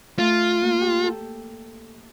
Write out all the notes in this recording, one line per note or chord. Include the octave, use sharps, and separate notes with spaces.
A3 F4
A#3
G4
A4